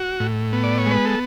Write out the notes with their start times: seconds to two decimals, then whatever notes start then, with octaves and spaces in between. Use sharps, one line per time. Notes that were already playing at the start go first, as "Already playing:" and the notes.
Already playing: F#4
0.20 A2
0.53 B3
0.64 D5
0.78 C#5
0.86 G#3
0.91 B4
1.05 A4